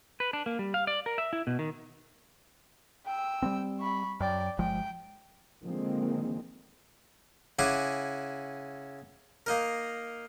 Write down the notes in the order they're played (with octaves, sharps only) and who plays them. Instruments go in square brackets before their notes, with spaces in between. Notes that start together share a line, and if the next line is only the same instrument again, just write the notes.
[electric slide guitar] B4
D4
A#3
G3
F5
D5
A#4
E5
E4
B2
D#3
[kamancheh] G5 E6
[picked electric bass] G3 B3 C4
[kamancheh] B5 C#6
[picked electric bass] F#2 [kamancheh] D5 G5
[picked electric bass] G1 F3 G#3 [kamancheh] G5
[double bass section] D3 D#3 F3 G#3 A#3 C4
[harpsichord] C#3 E4 F#5 G#5 D6
A#3 D#4 A#4